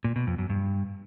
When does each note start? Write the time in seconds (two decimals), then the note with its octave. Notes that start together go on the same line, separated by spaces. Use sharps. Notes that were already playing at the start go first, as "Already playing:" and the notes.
0.04 A#2
0.16 B2
0.27 F2
0.38 F#2
0.50 G2